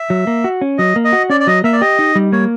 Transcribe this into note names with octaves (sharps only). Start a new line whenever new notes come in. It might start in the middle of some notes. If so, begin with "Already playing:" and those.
Already playing: E5
F#3
A#3
F#4
C#4
F#3 D#5
A#3
D#5
F#4
C#4 D5
D5
F#3 D#5
A#3 E5
D5
G4 D#5
D#4
G3
A#3 C#5